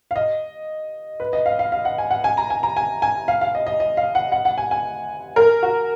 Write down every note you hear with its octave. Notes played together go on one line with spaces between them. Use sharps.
F5
D#5
B4
D#5
F5
F5
F5
F#5
G#5
F#5
G#5
A#5
G#5
A#5
G#5
G#5
F5
F5
D#5
D#5
D#5
F5
F#5
F#5
F#5
G#5
G#5
A#4
F#4